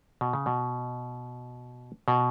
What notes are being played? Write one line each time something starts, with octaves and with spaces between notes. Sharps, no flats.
B2
C#3
B2
B2